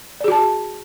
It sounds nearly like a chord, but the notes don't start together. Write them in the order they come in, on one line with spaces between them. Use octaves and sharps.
D5 G#4 F#4 A5